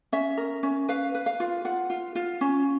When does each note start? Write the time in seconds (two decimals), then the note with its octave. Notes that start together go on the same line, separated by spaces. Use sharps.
0.12 C#4 E5
0.37 A#4
0.63 C#4
0.89 B4 F5
1.15 B4
1.26 F5
1.40 F4
1.65 F4 F#5
1.90 F4
2.15 F4
2.41 C#4